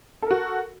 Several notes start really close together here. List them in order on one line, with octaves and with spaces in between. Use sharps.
A4 A#4 F#4